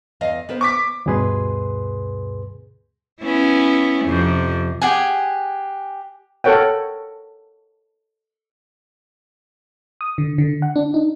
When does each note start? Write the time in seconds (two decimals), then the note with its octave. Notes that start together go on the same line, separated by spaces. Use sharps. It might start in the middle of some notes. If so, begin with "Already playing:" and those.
0.21 E2 D#5 F5
0.49 B3 A#4 C5
0.61 C#6 D6 B6
1.06 D2 G2 B2 G#4 B4 C6
3.21 B3 C#4 E4
4.05 F2 C3
4.82 G4 G#4 F#5 G#5
6.44 A4 A#4 C#5 F#5 G5
10.01 D#6
10.18 D3
10.38 D3
10.62 F#5
10.76 D4
10.94 D#4